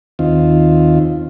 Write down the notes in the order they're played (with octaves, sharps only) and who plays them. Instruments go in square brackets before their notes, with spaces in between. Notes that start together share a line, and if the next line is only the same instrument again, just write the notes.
[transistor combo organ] D#2 D#3 C4 F4